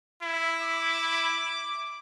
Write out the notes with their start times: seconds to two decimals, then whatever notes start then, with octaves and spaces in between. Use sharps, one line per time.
0.22 E4
0.62 D6